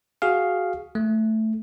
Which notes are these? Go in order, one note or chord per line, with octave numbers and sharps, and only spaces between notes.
F#4 G#4 F5
A3